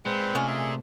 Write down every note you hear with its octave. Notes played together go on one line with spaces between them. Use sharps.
A#2 G#3 C4 B4 C5
C3 G#3 A3 C#4 F4
G#4 E5